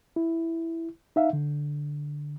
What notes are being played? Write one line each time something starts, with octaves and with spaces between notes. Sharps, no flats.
E4
D#4 E5 F5
D3